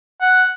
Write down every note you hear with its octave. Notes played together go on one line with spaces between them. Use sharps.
F#5